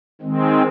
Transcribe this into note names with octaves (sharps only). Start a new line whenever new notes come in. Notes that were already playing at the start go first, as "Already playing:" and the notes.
D#3 G#3 C4